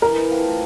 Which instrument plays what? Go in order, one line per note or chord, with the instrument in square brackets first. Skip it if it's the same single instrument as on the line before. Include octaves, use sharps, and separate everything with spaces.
[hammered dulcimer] E3 [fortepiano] A#4
[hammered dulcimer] A3 C4 F4